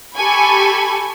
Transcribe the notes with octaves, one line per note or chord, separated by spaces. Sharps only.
G4 A4 G#5 B5 C#6